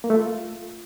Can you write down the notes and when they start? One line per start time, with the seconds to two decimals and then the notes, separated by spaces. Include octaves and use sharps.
0.04 A#3
0.10 A3
0.16 F4